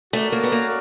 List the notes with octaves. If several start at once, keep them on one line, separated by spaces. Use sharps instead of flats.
A3 C#4 F#4 A#4 D5
A#3
B3
A#3